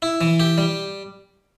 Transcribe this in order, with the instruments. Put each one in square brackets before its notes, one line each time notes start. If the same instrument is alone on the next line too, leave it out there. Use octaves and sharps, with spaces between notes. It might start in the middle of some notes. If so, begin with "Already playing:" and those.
[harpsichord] E4
E3
G4
G3